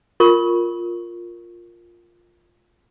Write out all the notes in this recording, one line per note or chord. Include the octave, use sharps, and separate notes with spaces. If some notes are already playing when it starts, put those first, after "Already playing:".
F4 A#4 C#6